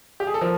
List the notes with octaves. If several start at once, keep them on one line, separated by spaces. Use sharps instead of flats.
G4
G#4
A4
F3 A#4